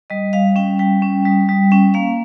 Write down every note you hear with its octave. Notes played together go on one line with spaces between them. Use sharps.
G3 D#5
G3 F5
C#4 G5
G3 G5
C#4
G3
G3
C#4 G5
A#3 F5